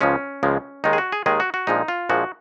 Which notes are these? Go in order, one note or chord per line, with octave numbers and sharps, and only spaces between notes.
C#2 C#3 F3 G#3 C#4
C#2 C#3 F3 G#3
D#2 D#3 G#3 D#4
G#4
F#4
G#4
D#2 D#3 G#3 G#4
F#4
F#4
A#1 A#2 F3 G#3 D#4
F4
A#1 A#2 F3 G#3 F#4